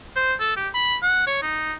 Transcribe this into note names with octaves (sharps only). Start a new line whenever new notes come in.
C5
A4
G4
B5
F#5
C#5
D#4